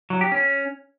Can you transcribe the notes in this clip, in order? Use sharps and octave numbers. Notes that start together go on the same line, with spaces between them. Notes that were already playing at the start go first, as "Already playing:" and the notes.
F#3
G4
C#4